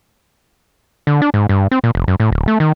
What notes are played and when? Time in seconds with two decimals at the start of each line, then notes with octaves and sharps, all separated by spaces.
1.07 D3
1.22 D4
1.34 G#2
1.49 G2
1.71 C4
1.84 A#2
1.95 F1
2.08 F#2
2.20 A2
2.32 D1
2.48 A3
2.60 D#3